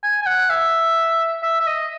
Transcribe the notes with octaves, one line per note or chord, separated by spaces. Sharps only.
G#5
G#5
F#5
E5
E5
E5
D#5